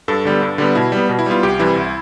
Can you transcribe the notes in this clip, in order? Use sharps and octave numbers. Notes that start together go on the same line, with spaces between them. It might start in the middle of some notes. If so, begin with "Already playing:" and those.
G2 A4
D3 G3 B3
G2
D3 G3 B3
B2 E4
G3 B3
B2
E4
G3 B3 F4
C2 G4
C3 E3 G3 E4
C2